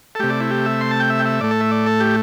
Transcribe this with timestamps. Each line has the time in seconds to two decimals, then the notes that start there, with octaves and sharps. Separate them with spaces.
0.15 A4
0.20 C3 A3 G4
0.30 D5
0.40 E4
0.51 G4
0.66 E5
0.81 C6
0.91 A5
1.00 G5
1.10 E5
1.20 G5
1.25 E5
1.41 A2 A3 D5
1.51 A4
1.60 E5
1.71 D5
1.86 A4
2.00 G4